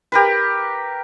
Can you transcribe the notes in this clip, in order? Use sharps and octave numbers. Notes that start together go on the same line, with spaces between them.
G4 A#4 B4